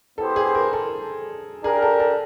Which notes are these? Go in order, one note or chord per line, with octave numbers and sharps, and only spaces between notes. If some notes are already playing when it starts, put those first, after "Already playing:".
B3 E4 G4 A4 C5
G#4
A#4
A4
D4 G4 G#4 A#4
A4
A4